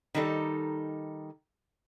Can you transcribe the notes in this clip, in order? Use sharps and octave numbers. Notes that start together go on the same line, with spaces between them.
D#3 G3 D#4 A4